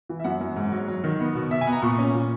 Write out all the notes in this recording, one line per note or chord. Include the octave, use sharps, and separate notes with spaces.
E3
E5
F#2 F#5
F#2
G#2
F#3
F#3
D#3
B3
B2
B2 E5
G#5
B3
A#5
A#2 C#6
C#4
A#2